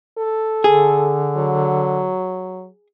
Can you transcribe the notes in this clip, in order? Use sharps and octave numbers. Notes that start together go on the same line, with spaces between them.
A4
D3 G#4
F#3